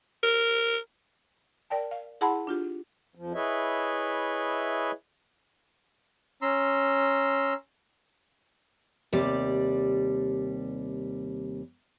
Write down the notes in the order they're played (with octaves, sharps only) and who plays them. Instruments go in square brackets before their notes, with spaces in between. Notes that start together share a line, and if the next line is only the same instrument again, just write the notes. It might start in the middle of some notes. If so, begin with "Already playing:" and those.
[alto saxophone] A#4
[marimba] A#4 D5 G5 A5
F5
E4 G#4 F#5 A5 B5 C6
D4 F4 G4
[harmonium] F2 F3
E4 G#4 B4 C#5 D#5 E5
[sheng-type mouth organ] C#4 A#5 C6 E6
[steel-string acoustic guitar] D#2 C3 G3 D5